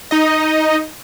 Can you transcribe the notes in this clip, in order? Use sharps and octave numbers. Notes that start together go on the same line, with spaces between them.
D#4 D#5